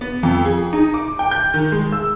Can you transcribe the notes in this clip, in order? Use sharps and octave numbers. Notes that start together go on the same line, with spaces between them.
B3
F2
G#4
D#4
D6
G5
G6
D#3
G#3
E6